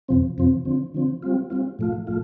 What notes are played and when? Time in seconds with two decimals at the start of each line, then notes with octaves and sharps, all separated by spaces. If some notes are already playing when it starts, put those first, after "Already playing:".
0.08 F2 C3 F3 C4
0.38 F2 C3 F3 C4
0.65 D3 F3 C4
0.94 D3 F3 C4
1.23 G3 C4 F4
1.50 G3 C4 F4
1.79 A2 F3 A3 F4
2.07 A2 F3 A3 F4